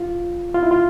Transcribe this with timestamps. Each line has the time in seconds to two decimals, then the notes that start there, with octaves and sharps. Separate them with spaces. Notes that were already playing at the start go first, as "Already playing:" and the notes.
Already playing: F4
0.54 F4
0.63 E4
0.71 F4